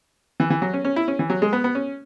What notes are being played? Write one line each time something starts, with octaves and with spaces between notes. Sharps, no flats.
E3
E3
F#3
C#4
C#4
E4
C#4
E3
F#3
G#3
B3
B3
C#4